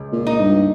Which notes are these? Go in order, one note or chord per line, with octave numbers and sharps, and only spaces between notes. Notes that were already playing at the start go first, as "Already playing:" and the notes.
Already playing: C#2
A#2
D#4
G2